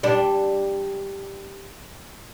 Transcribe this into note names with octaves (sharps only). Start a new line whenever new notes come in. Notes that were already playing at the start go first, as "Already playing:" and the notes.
G3 D4